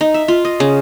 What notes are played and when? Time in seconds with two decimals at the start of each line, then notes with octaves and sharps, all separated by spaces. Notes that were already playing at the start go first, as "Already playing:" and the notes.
0.01 D#4
0.14 E5
0.28 F4
0.45 D#5
0.60 C#3